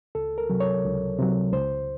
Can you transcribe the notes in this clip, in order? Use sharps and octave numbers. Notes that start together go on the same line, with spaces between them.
C#2 A4
A#4
C3 F#3
C#5
C#2
C3 F#3
C#2 C5